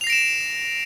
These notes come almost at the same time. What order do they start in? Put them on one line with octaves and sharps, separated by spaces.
F7 C7 A#6 D7 E7